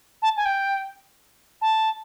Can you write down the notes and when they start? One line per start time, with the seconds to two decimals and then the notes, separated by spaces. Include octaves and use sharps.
0.22 A5
0.37 G#5
0.45 G5
1.61 A5